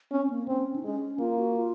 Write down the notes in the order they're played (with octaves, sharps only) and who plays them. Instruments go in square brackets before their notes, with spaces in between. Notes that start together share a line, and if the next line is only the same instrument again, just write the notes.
[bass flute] C4 [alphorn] C#4
[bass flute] C4
A#3
[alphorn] C4 [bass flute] C#4
[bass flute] D#4
[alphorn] G#3 [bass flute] C#4
[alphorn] A#3 [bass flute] F4
[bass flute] F#4
F4